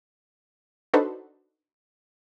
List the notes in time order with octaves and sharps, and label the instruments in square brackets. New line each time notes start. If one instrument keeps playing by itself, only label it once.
[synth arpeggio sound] D4 D#4 F#4 A4 B4 C5